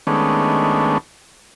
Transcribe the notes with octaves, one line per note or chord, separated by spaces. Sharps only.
D#3 G#3 A3 B3 C#4 D4